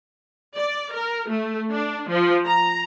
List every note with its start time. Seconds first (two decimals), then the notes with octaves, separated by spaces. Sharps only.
0.57 D5
0.93 A#4
1.30 A3
1.73 D4
2.10 F3
2.46 A#5